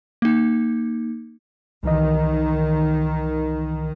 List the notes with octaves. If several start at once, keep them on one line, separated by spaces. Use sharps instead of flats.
A#3 D#4
C2 D#3 E3 D#5